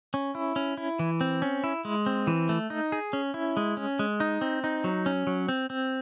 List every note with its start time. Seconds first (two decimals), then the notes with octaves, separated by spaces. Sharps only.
0.14 C#4
0.35 E4
0.56 C#4
0.77 E4
0.99 E3
1.21 C4
1.42 C#4
1.64 E4
1.85 G#3
2.06 C4
2.27 E3
2.49 A3
2.70 D#4
2.92 G#4
3.13 C#4
3.34 E4
3.57 G#3
3.77 C#4
3.99 G#3
4.20 D#4
4.41 C4
4.64 D#4
4.84 F#3
5.06 C#4
5.27 F#3
5.49 C4
5.70 C4